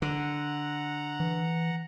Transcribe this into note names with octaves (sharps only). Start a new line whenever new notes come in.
D3 F#5 A#5
E3